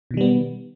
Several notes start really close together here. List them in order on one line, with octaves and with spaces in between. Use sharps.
B2 D#3 G3 B3